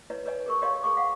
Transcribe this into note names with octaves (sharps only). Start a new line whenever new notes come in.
E4 B4 C#5 D#5
B4 C#5 D#5 G#5
G#4 A#4 C#6
G4 A#4 C#5 D#5 F5 C6
G#4 A#4 C#6 D6
F5 F#5